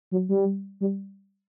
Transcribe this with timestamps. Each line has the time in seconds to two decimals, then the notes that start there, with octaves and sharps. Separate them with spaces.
0.11 F#3
0.29 G3
0.81 G3